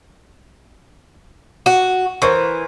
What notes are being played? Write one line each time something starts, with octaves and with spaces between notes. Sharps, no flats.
F#4
E3 A#4 C5 C#6